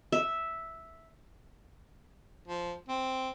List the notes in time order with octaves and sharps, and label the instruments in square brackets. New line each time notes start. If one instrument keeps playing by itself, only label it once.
[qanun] E5
[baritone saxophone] F3
C4